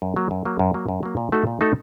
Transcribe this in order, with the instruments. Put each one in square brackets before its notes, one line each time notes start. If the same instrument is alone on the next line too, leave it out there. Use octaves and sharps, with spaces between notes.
[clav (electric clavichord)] F#2
F#3 A#3
F#2
F#3 A#3
F#2
F#3 A#3
F#2
F#3 A#3
A#2
A3 D#4 F#4 A4
A#2
A3 D#4 F#4 A4